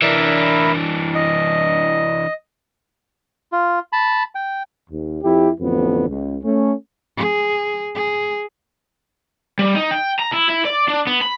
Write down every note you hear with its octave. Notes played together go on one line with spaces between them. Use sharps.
E3 D4 E4 A#4 B5
D#5
F4
A5 B5
G5
D#2
F2 E4 G4
A1 F2 D3 B3
C#2
A3 C#4
G#4
G#4
G3
D#4
G5
A#5
E4
E4
D5
D4
B3
B5